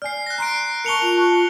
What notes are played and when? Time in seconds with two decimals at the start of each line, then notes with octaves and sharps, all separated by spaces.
0.02 D5 G#5 F6 C7
0.26 F#6 A#6
0.38 A#5 C6 F#6 C7 D7
0.84 A#4 A5 C#6 C#7 F7 G7
1.02 F4 F7
1.17 A5 C#6 F#6